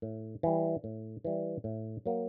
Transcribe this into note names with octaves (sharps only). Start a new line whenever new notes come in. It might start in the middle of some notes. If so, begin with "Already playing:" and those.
A2
E3 G3
A2
E3 G3
A2
F#3 A#3